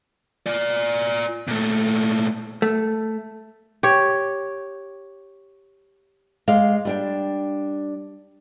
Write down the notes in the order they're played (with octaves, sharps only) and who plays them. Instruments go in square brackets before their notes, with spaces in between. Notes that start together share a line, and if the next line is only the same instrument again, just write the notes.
[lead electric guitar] F4 D5
A#2 A3
[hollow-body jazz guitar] A3
[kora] G4 C#5
[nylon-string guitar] G#3 D5 F5
G3 D4 G5